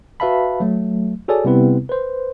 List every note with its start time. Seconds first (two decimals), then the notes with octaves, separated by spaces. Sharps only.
0.20 F#4 B4 E5 F5 A5 B5
0.60 F#3 A3
1.28 F#4 G#4 A4 C#5 D5 G#5
1.45 C3 G3 B3 C4 E4 B4
1.89 B4 C5